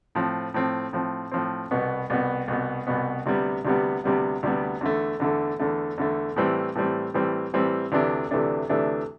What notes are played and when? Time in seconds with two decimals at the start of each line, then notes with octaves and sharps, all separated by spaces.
0.15 A2 F3 C4
0.54 A2 F3 C4
0.93 A2 F3 C4
1.31 A2 F3 C4
1.71 C2 B2 B3
2.10 C2 B2 B3
2.48 C2 B2 B3
2.87 C2 B2 B3
3.26 D2 C3 G3 B3
3.65 D2 C3 G3 B3
4.04 D2 C3 G3 B3
4.43 D2 C3 G3 B3
4.81 E2 D3 A3
5.20 E2 D3 A3
5.59 E2 D3 A3
5.98 E2 D3 A3
6.36 A2 E3 G3 C4
6.75 A2 E3 G3 C4
7.14 A2 E3 G3 C4
7.53 A2 E3 G3 C4
7.92 D2 C3 E3 A3 D4
8.31 D2 C3 E3 A3 D4
8.69 D2 C3 E3 A3 D4